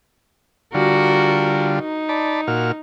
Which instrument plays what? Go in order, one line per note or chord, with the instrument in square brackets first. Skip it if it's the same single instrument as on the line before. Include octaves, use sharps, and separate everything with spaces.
[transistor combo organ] D3 G3 F4 [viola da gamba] F#4 A#4
[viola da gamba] D#4
[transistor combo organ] D5 A5 B5
A#2 F#4 F6